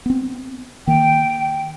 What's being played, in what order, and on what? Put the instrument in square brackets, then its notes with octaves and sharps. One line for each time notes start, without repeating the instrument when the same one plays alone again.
[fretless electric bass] B3 C4
[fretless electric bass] D#3 A#3 [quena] G5